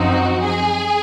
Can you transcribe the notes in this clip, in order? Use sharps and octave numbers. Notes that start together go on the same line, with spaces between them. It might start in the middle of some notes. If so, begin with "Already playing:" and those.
Already playing: F#2 F3 C4 D#4 F#4
G#4